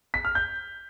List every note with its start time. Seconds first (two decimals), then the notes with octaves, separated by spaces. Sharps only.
0.14 B6
0.25 F6
0.35 G6